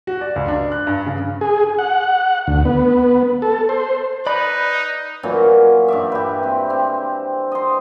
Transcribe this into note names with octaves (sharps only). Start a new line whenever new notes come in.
F#4
D5
C#2
D4
F#6
G2
C#3
G#4
F#5
D2
B3
A4
C5
D#4 B4 D5 B5
A#2 E3 F#3 C#4
G2 D5 E5
G4 B4
C4
C4
D#5 C6